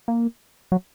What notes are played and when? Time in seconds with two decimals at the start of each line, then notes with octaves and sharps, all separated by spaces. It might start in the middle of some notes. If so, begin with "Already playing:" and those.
0.08 A#3
0.72 F#3